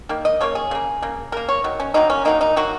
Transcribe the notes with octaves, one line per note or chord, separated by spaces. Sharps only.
D#3 A#3
D#5
C#3 A#3 C#5
G#4
C#3 A#3
C#3 A#3
C#3 A#3 A#4
C#5
D#3 F#3
C#4
D#3 F#3 A#3 D#4
C#4
D#3 F#3 A#3 D#4
D#4
D#3 F#3 A#3 F#4